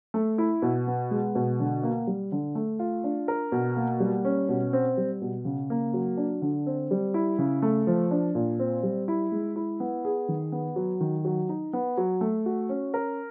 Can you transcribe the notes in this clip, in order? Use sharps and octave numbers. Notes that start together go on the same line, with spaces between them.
A3
E4
B2
B3
G#3
B2
D3
A#3
G3
D3
A3
F4
D4
A#4
B2
A#3
G3
C#4
B2
C4
G3
B2
C#3
A#3
F#3
D4
D3
C4
G3
E4
C#3
A3
F3
D4
A#2
C4
G3
E4
G#3
E4
B3
G#4
D#3
B3
F#3
D#3
F#3
D#4
B3
F#3
A3
F#4
C#4
A#4